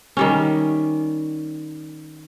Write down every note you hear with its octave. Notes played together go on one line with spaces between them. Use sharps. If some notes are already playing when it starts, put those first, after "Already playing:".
D#3 G3 C#4